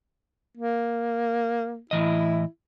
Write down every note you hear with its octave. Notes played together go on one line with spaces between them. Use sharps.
A#3
A2 E3 E4 D#5